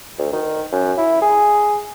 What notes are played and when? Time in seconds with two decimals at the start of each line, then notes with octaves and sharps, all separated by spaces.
0.19 D2
0.32 D#3
0.72 F#2
0.97 E4
1.22 G#4